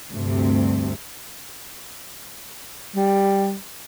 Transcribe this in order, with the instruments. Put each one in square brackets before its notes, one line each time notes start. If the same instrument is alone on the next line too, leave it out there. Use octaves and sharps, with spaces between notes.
[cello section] D2 G2 C3
[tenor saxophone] G3